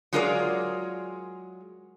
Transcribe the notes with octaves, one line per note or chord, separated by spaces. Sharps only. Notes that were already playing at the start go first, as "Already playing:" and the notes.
F#3 G#3 F4 G#4 A#4 D5